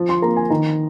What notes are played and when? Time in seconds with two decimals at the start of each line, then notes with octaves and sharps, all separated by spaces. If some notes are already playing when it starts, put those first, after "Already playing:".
Already playing: F3
0.09 C6
0.22 A#3 A#5
0.36 G#5
0.50 D#3 A#5